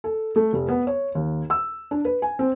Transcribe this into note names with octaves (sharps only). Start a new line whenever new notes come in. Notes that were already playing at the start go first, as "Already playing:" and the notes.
A4
A3
F1
B3
C#5
D#2
E6
D4
B4
G#5
C4